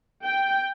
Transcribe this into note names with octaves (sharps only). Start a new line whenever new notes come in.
G5